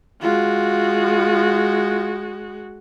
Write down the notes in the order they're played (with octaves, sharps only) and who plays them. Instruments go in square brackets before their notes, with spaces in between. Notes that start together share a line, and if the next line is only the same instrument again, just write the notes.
[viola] G#3 F#4 [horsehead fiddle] F4